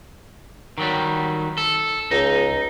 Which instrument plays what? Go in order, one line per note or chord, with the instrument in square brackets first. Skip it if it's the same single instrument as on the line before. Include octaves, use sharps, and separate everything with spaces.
[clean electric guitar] D#3 F#3 G3
A4
[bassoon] C#2 [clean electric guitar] D#4